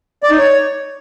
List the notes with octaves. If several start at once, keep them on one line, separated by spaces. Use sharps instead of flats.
D5
D#4
C#5